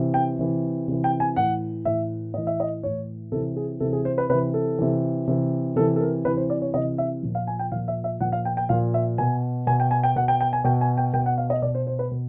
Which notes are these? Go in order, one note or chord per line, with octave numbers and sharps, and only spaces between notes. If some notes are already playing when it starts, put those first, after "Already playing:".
Already playing: C3 E3
G5
C3 E3
C3 E3
G5
G#5
A2 E3 F#5
A2 E3 E5
A2 E3 D#5
E5
D#5
A2 E3 C#5
C3 E3 A4
G#4
C3 E3 A4
G#4
C5
B4
C3 E3 B4
A4
C3 E3
C3 E3
C3 E3 A4
A4
A#4
C3 E3 B4
C5
D5
C#5
C3 E3 D#5
E5
A#2 F3
F5
G#5
G5
A#2 F3 F5
E5
E5
A#2 F3 F#5
F5
G5
G5
A#2 F3 F5
E5
B2 G#5
B2 G#5
G5
G#5
G5
B2 F#5
G5
G5
G#5
B2 G5
G#5
G5
B2 G5
F#5
F5
D#5
B2 D5
C5
C5
B4
B2